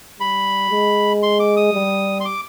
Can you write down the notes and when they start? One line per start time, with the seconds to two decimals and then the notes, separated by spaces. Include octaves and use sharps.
0.20 G3 B5
0.71 G#3
1.23 C6
1.40 D6
1.57 D#6
1.73 G3
2.20 C6
2.25 D6